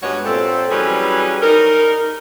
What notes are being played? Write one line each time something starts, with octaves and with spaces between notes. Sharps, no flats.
G2 G#3 B3 F#4 C#5
A#2 C4 A4
E3 F#3 G3 C#4 G#4 B4
D#4 A#4